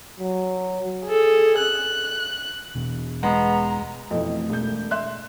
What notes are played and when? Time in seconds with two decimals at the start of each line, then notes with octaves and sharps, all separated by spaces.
0.20 F#3
1.06 G#4 A4
1.59 F#6
2.75 E1 B2
3.23 G#3 B3 A#5
4.11 F2 B2 E3 A3
4.50 E1 G6
4.91 E5 C6 F#6